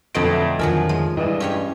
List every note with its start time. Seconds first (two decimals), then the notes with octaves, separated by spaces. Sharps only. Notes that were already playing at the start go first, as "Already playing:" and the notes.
0.15 F2 B2 D3 F#3 D#5 D7
0.31 A3
0.59 F2 D#3 F3 F#3 A#4 D5 E5 G#5
0.89 G#3
1.17 G2 E3 D#5
1.40 C#4 G4 C#5